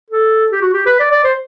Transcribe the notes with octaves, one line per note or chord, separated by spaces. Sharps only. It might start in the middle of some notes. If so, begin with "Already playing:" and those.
A4
G4
F#4
G4
B4
D5
D5
C5